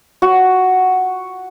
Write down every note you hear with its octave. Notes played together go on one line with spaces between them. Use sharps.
F#4